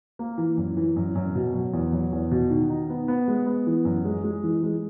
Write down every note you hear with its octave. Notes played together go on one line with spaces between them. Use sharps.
A#3
E3
F#2
E3
F#2
F#2
B2
F#3
E2
F#3
E2
B2
D#3
D#4
B3
B3
G#3
B3
E3
F#2
G#3
G#3
E3
G#3